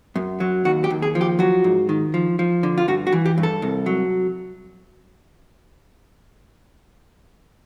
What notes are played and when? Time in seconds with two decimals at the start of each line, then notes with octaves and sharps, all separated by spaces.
0.15 F#2
0.40 F#3
0.65 D#2 F#4
0.84 G4
0.90 D#2
1.02 G#4
1.15 F3
1.21 G4
1.39 F#3 F#4
1.64 G#2
1.89 D#3
2.14 F3
2.39 F3
2.63 D3
2.78 F4
2.88 G2 F#4
3.07 F#4
3.12 E3
3.26 G4
3.38 G2
3.43 A4
3.62 C2
3.86 F#3